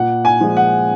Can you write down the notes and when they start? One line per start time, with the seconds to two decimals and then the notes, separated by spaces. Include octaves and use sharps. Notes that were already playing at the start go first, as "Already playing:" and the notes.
Already playing: A#2 F#5
0.25 G#5
0.41 F3 G#3
0.57 F#5